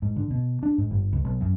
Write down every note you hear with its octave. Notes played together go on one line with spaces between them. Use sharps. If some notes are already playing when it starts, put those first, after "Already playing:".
G#2
D3
B2
D4
G#2
G1
C#2
B1
F#2